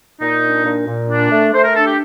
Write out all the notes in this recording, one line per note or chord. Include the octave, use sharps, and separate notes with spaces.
A#2 D#4
D4
A#2
A#2
D4
A3
A3 C5
A#4
D4 A4
G4